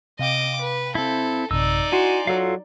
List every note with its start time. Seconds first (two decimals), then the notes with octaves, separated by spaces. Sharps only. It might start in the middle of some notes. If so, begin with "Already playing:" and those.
0.19 C3 D#5 F5 G5 D6
0.61 B4
0.95 C4 E4 A4
1.51 A1 F#2 C3 D#4 D5 E6
1.92 E4 F#4 G#5 C6 C7
2.27 F#3 F4 A4 F5